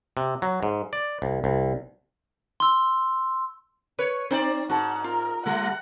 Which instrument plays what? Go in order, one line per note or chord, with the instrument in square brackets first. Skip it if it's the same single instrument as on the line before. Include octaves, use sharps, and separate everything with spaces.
[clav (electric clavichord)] C3
F#3
G#2
D5
C2
C2
[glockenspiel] C6 E6
[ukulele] B4 [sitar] C#5
[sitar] C4 D5 [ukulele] D#4 C5
[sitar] G#2 [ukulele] F#4 A5 [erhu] F#5
[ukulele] F4 [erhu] A#4
[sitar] G3 A3 [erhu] F#5